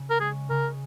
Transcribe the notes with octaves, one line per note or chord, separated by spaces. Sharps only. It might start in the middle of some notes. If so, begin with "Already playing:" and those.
Already playing: C#3
A#4
G#3 C#4 G#4
C#3 A#4